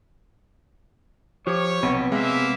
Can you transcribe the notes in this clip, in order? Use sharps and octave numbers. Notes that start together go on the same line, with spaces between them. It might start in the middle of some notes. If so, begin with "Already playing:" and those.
F3 G4 C#5 C#6 D6
B1 C3 B3
G#3 A#3 E5